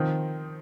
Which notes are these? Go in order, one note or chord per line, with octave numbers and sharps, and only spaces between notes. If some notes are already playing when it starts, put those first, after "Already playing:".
Already playing: D#3 F3 C4 D#4